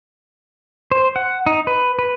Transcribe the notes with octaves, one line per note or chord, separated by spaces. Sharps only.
C5
F#5
D#4
B4
B4